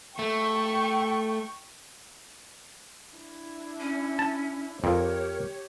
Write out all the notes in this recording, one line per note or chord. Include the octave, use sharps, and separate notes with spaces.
A3 G5 C#6
D4 E4
C#4
A5
F2 G4 A#4 C#5